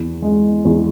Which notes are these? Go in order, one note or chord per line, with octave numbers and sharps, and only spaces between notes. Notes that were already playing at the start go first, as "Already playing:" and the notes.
Already playing: E2
G#3
E2